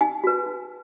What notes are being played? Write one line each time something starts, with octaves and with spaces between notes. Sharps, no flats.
D#4 G#5
F#4 B4
D#4